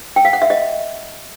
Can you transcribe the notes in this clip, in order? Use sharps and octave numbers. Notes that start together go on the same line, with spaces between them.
G5
F5
F#5
E5
D#5